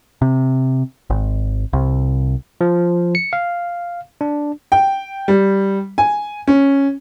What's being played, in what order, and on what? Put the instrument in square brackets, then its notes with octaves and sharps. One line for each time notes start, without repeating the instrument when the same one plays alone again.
[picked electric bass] C3
G#1
C2
[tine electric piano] F3
C#7
F5
D4
[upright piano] G5
G3
G#5
C#4